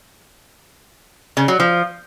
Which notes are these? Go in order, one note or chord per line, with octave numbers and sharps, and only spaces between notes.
C#3
F#3
F3